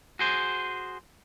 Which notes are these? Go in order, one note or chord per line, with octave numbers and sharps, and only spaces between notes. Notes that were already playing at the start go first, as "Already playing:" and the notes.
F#4 G#4 C5